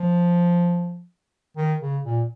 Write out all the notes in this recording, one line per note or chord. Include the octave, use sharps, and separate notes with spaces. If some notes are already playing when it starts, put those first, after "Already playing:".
Already playing: F3
D#3
C#3
A#2